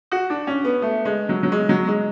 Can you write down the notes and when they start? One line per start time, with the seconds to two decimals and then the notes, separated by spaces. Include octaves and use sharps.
0.12 F#4
0.30 D4
0.47 C#4
0.64 B3
0.82 A3
1.05 G#3
1.29 F#3
1.43 F#3
1.52 G#3
1.69 F#3
1.87 G#3